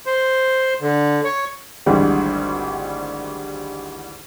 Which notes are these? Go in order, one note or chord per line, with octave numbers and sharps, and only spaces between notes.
C5
D3
C#5
G#1 D2 G#2 D3 E3 G3